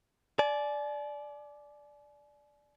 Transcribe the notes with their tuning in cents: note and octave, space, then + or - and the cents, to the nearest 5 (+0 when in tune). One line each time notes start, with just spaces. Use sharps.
D5 +0 G#5 +45